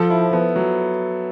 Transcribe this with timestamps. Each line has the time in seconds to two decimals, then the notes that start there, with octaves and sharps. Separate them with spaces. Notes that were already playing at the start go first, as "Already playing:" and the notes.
Already playing: F3 A4
0.10 E4
0.33 B3
0.56 F#3